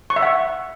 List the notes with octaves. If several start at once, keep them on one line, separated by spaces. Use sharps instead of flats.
C#6
E5
F#5